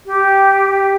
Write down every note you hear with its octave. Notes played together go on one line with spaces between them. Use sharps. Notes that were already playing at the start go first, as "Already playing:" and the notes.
G4